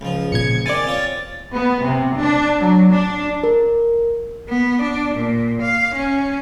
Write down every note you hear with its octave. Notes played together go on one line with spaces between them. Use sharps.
C#2 F3
G1 A#2 G#6 C#7
C3 D#3 C4 D5 G#5 A6
C4 F4 C#5
B3
C3
D4
F#3
D4
A#4
B3
D4
A#2
F5
C#4